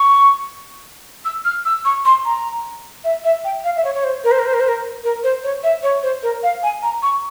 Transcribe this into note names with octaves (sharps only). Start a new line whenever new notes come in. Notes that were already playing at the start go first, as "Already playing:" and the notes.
Already playing: C#6
E6
F6
E6
C#6
C6
A#5
E5
E5
G5
F5
E5
C#5
C#5
C5
A#4
C5
A#4
C5
A#4
C5
A#4
A#4
C5
C#5
E5
C#5
C5
A#4
F5
G#5
A#5
C#6